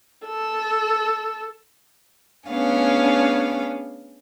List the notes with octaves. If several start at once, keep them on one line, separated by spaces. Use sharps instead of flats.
A4
A3 B3 C#4 D4 G#4 F5